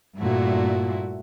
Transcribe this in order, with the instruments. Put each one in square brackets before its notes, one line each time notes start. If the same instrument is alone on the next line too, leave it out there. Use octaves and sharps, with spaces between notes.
[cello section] G2 A#2 [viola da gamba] A3 E4 F#4